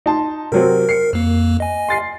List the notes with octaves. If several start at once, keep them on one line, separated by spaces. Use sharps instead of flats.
D#4 A5 C6
C3 F#3 C4 A#4
A#4 C7 C#7
F2 A#3
D#5 G#5
C6 A6 C7